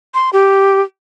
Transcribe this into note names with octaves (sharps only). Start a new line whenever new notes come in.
C6
G4